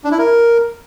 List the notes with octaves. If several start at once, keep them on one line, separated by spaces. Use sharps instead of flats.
D4
E4
A#4